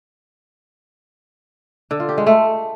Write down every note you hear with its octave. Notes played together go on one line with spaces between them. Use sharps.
D3
F4
G4
G#3
A3